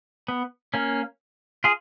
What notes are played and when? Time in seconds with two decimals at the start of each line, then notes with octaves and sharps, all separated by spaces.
0.28 B3
0.74 A#3 C#4
1.64 F4 G#4